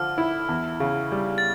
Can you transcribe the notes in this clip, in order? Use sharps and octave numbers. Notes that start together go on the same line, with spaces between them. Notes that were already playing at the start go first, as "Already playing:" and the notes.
Already playing: D3 F3 F6
E4
E2
C#3
G3
A6